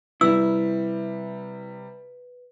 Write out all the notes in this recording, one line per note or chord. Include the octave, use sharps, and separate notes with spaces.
C3 G3 E4 B4 E6